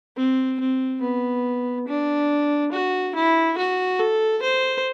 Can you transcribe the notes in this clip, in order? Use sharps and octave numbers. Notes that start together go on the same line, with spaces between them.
C4
C4
B3
D4
F#4
E4
F#4
A4
C5